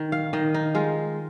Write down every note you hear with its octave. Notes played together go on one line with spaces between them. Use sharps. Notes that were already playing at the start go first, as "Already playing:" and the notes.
Already playing: D#3
F5
D#3 D#5
D#4
G#3 F4